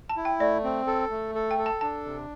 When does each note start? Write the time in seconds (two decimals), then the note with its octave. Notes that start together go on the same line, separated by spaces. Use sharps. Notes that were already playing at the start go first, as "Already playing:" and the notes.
0.09 A5
0.17 E4
0.25 G5
0.40 A3 D5
0.64 C4
0.87 A4
1.11 A3
1.35 A4
1.51 G5
1.58 A4
1.66 A5
1.81 D4 A5
2.05 C3